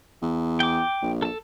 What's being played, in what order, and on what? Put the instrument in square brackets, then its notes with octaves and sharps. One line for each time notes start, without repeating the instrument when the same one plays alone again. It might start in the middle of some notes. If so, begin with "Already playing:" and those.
[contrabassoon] E2
[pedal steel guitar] G5 D6
[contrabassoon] A#1
[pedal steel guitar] A4 A5